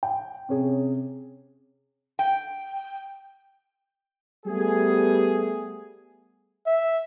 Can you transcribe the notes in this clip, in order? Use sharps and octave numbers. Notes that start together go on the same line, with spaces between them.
G5
C3 C#4 G#4
G5
G3 A3 B3 G4 G#4
E5